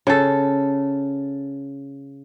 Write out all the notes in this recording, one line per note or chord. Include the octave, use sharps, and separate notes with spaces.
C#3 A4